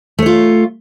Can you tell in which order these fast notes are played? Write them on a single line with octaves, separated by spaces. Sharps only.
A3 C#5 F4